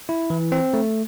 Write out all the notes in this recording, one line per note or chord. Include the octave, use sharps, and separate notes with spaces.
E4
E3
C4
A3